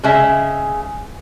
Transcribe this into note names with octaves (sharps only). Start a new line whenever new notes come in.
C#3 G#3 E5